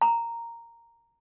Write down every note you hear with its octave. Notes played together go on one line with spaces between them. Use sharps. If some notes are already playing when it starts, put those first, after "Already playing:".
A#5